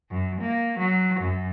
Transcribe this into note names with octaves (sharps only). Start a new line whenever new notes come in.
F#2
A#3
F#3
F#2